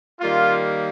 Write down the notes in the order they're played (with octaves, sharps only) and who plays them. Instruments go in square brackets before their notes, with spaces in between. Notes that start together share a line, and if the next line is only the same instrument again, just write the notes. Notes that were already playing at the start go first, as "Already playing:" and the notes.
[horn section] D#3 G3 A#3 F4